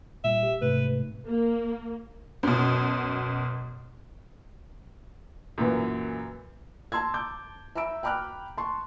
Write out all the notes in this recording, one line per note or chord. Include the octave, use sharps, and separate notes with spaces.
A#2 G3 E5
G4
G#2 C3 A3 B4
A#3
F#2 B2
F#2 A#2 E3
A5 A#5 C6 E6 G#6
A5 D6 G6
E5 A#5 B5 E6 D7
G5 A#5 B5 D6 F6 F#6
A5 C6 C#6